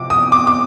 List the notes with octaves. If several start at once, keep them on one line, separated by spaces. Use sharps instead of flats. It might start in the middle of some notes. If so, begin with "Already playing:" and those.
Already playing: C3 F3 D6
D#6
D6
D6